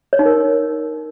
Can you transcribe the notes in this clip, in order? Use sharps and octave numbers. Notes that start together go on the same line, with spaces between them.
C#5
D#4
A#4